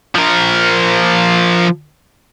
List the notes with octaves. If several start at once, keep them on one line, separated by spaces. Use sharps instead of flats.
F3 A#4